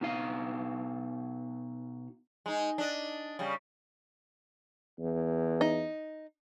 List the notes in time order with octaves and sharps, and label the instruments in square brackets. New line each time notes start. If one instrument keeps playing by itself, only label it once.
[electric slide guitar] B2 D#4 F5
[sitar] G#3 D#4
D4 D#5
C#3 G3
[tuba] E2
[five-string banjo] D#4